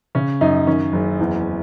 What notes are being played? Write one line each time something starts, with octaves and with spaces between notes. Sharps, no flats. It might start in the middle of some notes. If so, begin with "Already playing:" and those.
C#3 C#4
F#2 D#4
D#3 C#4
F#1
E2